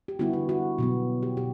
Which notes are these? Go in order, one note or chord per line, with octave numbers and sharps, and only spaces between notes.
G4
D3 G3 B3 E4 F#4
E4
F#4
B2 F#3 B3
G4
B2 G4